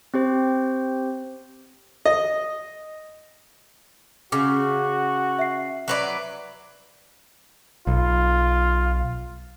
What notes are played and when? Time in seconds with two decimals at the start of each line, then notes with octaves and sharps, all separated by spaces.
0.14 C4 G4 C5
2.05 D#5
4.32 C#3 F#4 D6
5.39 E5 C7
5.88 F#3 B4 D5
7.87 B1 F4